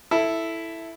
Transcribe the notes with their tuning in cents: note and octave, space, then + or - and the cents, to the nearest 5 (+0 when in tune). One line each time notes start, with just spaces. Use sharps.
E4 +0 A4 +0